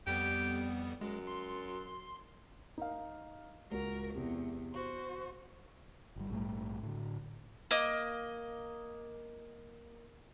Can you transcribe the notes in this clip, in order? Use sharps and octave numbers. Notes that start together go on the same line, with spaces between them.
F2 G3 B3 G4
F#2 G#3
C6
D#4 A#4 F5
C#2 F#4 A#4
E2 C3
F#4 C5
G1 G3
A#1 G#2 G3 A3
A2 D3
A#3 D#5